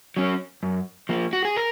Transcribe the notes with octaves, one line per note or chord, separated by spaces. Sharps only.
F#3 C#4
F#2
F3 A#3
F#4
G#4
A#4